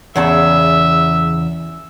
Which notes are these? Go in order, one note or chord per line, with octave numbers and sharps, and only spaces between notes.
E2 C#3 E5 A5